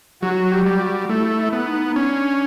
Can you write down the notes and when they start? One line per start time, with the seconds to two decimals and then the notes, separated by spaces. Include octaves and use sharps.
0.22 F#3 F#4
0.51 G4
0.66 G3
0.80 F#4
1.09 A3 E4
1.39 E4
1.53 B3
1.68 D#4
1.96 C#4 D4